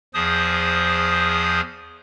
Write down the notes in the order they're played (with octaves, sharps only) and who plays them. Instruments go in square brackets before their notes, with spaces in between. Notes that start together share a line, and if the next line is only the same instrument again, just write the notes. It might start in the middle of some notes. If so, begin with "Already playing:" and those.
[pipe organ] E2 F3 G#4 C5 D#6